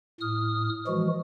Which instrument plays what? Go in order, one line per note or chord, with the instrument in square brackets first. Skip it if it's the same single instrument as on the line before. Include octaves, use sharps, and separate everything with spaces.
[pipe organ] A2 D#6 F6
E3 F3 G#3 F#4